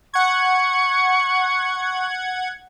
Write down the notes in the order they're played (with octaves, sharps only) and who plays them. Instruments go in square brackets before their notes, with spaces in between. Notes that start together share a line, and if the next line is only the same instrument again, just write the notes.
[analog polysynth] F#5 G#6 [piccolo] C#6